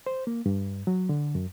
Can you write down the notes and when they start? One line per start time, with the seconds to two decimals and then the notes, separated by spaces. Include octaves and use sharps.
0.06 C5
0.27 A#3
0.46 G2
0.87 F#3
1.09 D3
1.35 F#2